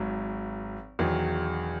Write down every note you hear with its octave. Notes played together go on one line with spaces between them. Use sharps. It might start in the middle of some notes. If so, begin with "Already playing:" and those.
Already playing: G#1 G#2 F#3
E1 E2 D#3 F#3